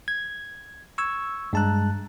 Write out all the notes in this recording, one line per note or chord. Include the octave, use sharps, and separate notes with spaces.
G#6
C#6 E6 G#6
G2 G#3 A5 A#5 F#6